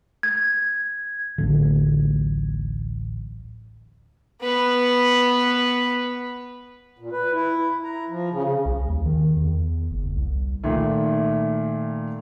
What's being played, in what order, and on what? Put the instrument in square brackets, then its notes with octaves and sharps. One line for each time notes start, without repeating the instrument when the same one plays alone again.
[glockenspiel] G#6
[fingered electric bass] D1 A1 D3
[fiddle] B3 B4
[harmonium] A#2
B4
E4
A#5
F3
C#3
C#3
[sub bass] C2
D#2
D#3
E2
F#1
C2
[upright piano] A#2 D#3 A3